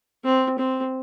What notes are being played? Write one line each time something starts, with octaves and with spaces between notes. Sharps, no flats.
C4
C4